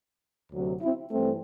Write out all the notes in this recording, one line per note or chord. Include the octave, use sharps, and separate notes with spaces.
D2 C3 F#3
C4 E4
G2 E3 G3 A3 C4